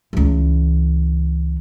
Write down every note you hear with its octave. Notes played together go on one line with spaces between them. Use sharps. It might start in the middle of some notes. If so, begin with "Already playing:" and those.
C#2 E3